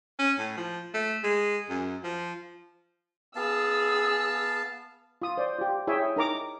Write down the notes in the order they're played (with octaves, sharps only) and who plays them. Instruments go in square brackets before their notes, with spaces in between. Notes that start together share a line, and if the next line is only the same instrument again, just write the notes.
[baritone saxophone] C#4
A2
F3
A3
G#3
F#2
F3
[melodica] B3 F5 A5 [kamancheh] G#4 E6
[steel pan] F4 D#6
C5 D5
F4 G4
E4 G#4 C#5 E5 G5 G#5
D#4 A#4 A#5 D6